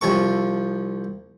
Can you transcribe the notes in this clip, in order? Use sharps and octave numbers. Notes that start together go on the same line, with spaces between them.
C2 F3 A4 C#6